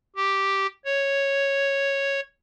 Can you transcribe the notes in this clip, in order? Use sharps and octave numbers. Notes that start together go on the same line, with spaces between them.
G4
C#5